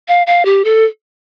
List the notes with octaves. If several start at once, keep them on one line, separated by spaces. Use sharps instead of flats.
F5
F5
G4
A4